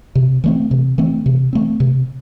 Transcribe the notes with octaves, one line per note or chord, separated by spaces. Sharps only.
C3
E3 A3 C4
C3
E3 A3 C4
C3
E3 A3 C4
C3